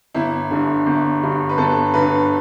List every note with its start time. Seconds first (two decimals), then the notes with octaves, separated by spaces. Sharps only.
0.14 G1 E4
0.51 G2 D3
0.86 G1
1.22 G2 D3
1.49 B4
1.57 G1 A4
1.94 G2 D3 B4